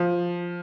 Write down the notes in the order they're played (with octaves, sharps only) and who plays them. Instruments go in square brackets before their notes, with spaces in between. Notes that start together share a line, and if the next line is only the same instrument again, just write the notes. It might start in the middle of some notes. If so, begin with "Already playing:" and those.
Already playing: [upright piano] F3